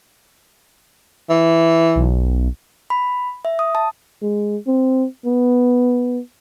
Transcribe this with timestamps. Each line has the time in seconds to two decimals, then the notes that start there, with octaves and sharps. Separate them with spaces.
1.30 E3
1.95 B1
2.90 B5
3.45 E5
3.59 D#6
3.75 A5
4.22 G#3
4.67 C4
5.26 B3